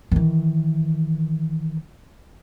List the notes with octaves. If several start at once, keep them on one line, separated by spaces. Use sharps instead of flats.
D#3 E3